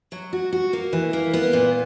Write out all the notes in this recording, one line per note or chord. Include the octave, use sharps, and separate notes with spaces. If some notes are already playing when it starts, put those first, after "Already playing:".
F#3
F#4
F#4
A#3
E3
A#3
B3
A#2